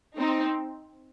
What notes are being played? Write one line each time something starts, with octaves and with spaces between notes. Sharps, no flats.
C4 D#4